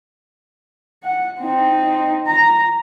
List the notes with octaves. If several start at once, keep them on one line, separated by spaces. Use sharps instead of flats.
F#5
C4 D#4
A#5